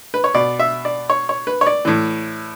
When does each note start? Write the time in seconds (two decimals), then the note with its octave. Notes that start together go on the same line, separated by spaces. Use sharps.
0.14 B4
0.24 C#5
0.34 B2 D5
0.59 E5
0.85 D5
1.10 C#5
1.29 C#5
1.47 B4
1.61 C#5
1.67 D5
1.85 A2 E3